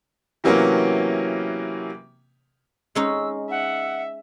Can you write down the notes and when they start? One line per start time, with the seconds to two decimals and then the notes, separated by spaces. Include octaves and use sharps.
0.44 C3 E3 F#3 A#3 B3 C#4
2.95 G#3 C#4 D#4 E6
3.50 E5 F#5